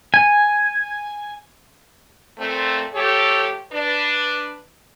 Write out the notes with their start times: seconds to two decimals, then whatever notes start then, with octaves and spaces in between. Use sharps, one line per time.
0.14 G#5
2.38 A#2 A3 C4
2.94 F3 A3 G4 A4 C#5
3.71 D4 B4